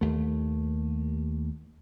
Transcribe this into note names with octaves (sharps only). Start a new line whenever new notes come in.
D#2 A3